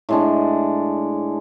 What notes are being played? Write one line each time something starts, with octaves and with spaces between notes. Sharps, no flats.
A2 G#3 D4